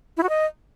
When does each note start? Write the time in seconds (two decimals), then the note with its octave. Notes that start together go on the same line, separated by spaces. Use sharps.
0.17 E4
0.23 F#4
0.29 D#5